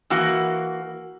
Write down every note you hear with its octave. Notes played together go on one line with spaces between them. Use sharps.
E3 A#3 F#4